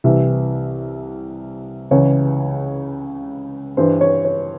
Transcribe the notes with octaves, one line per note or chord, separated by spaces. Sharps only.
C2 C3 E3 E5
C#2 C#3 E3 C#5
G2 E3 C5
C#5
C#5